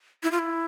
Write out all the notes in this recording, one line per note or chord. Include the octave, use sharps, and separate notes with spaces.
E4
F4
E4